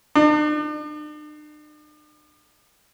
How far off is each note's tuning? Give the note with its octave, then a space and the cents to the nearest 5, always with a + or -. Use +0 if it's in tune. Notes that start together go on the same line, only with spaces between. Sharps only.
D4 +45